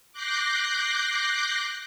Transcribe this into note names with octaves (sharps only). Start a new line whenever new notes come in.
D6 F#6 G6 A#6 C7